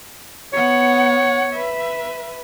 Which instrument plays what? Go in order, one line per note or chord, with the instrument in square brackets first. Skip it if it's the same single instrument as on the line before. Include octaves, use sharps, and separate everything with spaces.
[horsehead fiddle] B3 F#5 [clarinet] C#5
[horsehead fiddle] B4 E5